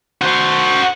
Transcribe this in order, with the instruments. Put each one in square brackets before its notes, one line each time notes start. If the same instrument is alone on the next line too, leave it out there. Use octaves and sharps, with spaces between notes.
[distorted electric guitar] F#4 C5